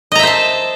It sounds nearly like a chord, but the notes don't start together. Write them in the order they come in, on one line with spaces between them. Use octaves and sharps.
D#5 A#5 E5 C5 A5